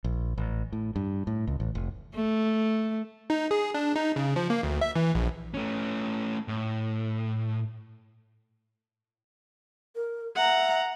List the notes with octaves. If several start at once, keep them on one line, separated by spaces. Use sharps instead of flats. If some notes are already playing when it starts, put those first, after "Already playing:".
A#1
A1
A2
G2
A2
C#2
A1
F1
A3
D#4
G#4
D4
D#4
C#3
F3
A#3
D2
E5
E3
A#1
A3 C#4
A2
A#4
E5 F#5 A#5